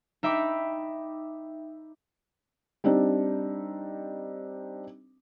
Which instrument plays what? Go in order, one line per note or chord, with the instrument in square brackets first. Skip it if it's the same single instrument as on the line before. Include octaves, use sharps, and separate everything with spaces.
[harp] D#4 E5 G5 B5 D6
[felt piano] G3 C4 D4 D#4